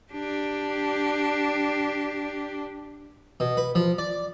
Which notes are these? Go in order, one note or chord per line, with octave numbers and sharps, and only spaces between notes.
D4 G4
B2
B4
F3
D5